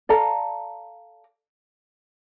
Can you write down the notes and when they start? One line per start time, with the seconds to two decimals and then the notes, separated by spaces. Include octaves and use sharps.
0.09 A4 D5 F5 A#5